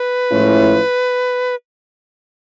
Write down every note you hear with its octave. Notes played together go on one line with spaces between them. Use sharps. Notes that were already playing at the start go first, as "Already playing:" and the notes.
Already playing: B4
A2 F3 G#3 C#4 E4